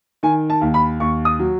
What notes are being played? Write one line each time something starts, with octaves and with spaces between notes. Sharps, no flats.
D#3 G#5
A5
D#2
B5
D#2 C#6
D#6
F#3